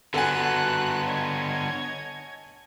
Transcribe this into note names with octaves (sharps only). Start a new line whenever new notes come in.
D3 B3 F#4 A4 F#5 G#5 F#6
C#5 D#5 G#6